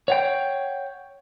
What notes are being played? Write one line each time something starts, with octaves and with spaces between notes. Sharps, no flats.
C#5 F#5 G5